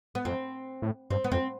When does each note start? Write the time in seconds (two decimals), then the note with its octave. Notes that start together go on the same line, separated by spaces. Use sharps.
0.15 B3
0.25 F2 C4
0.82 A2
1.10 G2 C4
1.24 B3
1.32 F2 C4